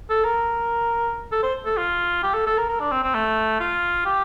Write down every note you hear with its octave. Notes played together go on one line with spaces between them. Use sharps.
A4
A#4
A4
C5
A4
F4
G4
A4
A4
A#4
A#4
D4
C4
C4
A3
F4
G4